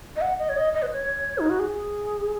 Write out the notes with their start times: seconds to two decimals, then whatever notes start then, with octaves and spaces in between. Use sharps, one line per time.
0.16 D#5
0.21 F#5
0.39 D#5
0.49 C#5
0.57 D#5
0.74 D#5
0.82 B4
0.91 C#5
1.39 D#4
1.50 F#4
1.60 G#4